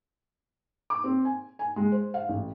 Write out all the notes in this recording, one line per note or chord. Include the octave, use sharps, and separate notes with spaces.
D6
C4
G#5
G#5
G#3
C5
F5
A1